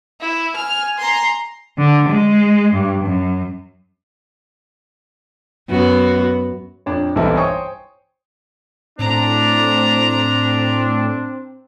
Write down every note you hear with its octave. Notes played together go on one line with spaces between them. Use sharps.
E4
G#5 F6
A#5 C6
D3
G#3
G2
F#2
F#2 B3 F#4
F2 D4 C#5
B1 G2 E3 C4 E4 A4
C5 C#5 G5 G#5 C#6 D#6
A2 C4 D4 A#5